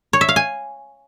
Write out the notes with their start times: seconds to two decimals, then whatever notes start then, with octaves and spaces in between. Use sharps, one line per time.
0.13 C#5
0.21 E5
0.29 F5
0.36 G#5